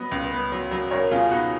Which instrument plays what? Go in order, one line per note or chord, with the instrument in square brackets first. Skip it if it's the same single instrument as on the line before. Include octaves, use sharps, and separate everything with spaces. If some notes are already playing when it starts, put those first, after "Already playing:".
Already playing: [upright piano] F#3 B3 B4 D#5
C#2
B3
F#3
F#3
C#2 A#4 C#5
B2 F4 G#4
B3 D#4 F#4